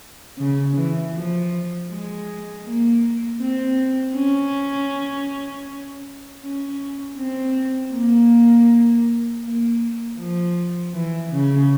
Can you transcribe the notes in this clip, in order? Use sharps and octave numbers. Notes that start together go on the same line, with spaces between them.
C#3
E3
F3
G#3
A#3
C4
C#4
C#4
C4
A#3
A#3
F3
E3
C#3